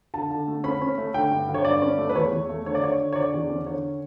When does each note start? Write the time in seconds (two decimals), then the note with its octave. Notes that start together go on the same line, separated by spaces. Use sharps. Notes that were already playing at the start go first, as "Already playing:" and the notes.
0.14 D3 A5
0.31 D3
0.48 A3
0.64 C#4 B5
0.82 C#4
0.98 A3
1.14 D3 G5
1.31 G2
1.49 D3
1.54 C#5
1.65 G2 D5
1.82 C#4
1.98 A3
2.09 B4
2.15 E2 C#5
2.32 E2
2.49 A3
2.66 D3 C#5
2.75 D5
2.83 D3 C#5
3.00 D3
3.13 C#5
3.16 D3 D5
3.34 E2
3.50 C#4
3.66 D3 C#5